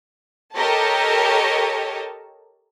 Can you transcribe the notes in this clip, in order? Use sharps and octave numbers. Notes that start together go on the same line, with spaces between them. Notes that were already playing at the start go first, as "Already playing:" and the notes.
G4 A4 A#4 C#5 D#5 A5